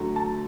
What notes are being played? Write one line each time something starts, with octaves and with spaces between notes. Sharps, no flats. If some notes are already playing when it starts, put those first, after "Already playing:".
Already playing: D2 D3 F#3 A3
A5